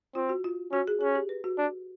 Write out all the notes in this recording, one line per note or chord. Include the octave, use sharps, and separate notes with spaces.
C4 F4
F#4
F4
C#4 F#4
G#4
C#4 G#4
G4
B4
F#4
D4